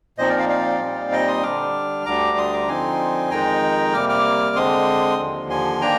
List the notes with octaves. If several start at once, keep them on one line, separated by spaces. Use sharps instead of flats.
A#2 F3 C4 D#4 C5 D#5
A#4 D5
D5 F5
D5 F5
A#2 G3 C4 D#4
D#5 G5
C6 D#6
D3 G3 D4 D6 F6
D2 D3 G3 D4 A#5 D6
C6 D#6
A#5 D6
D3 F3 C4 D#4 G#5 C6
F2 D#3 G#3 D#4 G5 A#5
C3 G3 A#3 D6 F6
D6 F6
D3 G#3 C4 C6 D#6
D#2 D3 F3
G#5 C6
D#3 A#3 D4 G5 A#5